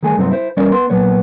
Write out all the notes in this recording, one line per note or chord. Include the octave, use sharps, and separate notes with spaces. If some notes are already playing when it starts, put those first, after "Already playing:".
D#3 G3 A3 G#4 A4 G#5
G2 C3 F#3 C4 D#4
E4 C5
E2 G3 C#4 A#4 D5 D#5
B3 C6
A#2 F#3 B3 C#5